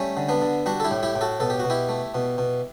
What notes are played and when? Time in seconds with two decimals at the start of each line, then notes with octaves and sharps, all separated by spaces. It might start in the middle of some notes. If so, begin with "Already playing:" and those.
Already playing: G3 A3 C#4
0.17 D3
0.29 B3 D4
0.42 D3
0.66 G3 D4 F#4
0.80 A4
0.84 E4 G4
0.91 A2
1.03 E4 G4
1.16 A2
1.21 F#4 A4
1.40 B2 A4
1.50 G4
1.60 B2 F#4
1.70 E4 G4
1.89 A3
2.15 B2
2.38 B2